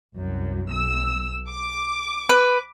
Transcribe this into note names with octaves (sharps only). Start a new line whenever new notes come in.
C2 F#2
B1 E6
D6
B4